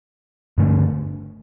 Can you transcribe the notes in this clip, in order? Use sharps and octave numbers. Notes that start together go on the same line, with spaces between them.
G2 D3 A3 D4